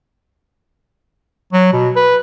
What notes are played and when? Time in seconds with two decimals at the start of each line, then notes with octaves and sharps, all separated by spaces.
1.53 F#3
1.73 B2
1.96 B4